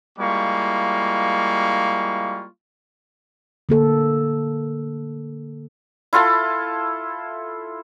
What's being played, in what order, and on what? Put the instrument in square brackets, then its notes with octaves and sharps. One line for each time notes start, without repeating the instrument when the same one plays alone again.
[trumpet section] G3 G#3 A#3 E4 F4 C#6
[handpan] D3 A#3 A4
[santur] E4 F4 A4 A5